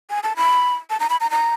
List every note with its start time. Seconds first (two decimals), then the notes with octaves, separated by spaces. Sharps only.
0.10 G#5
0.23 A5
0.37 B5
0.90 A5
1.00 A#5
1.10 B5
1.20 A#5
1.31 A#5